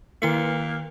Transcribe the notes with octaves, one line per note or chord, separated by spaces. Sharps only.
D#3 A#3 E4 C#7